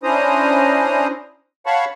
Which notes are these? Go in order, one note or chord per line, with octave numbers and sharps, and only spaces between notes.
C#4 D4 E4 C5 A#5 D#6
C#5 F5 F#5 A5 B5 C#6